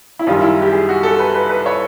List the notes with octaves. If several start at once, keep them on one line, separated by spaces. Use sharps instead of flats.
E4
F#2 D#3 G3 F4
E4
G4
G#4
F#4
A4
B4
B4
B4
C#5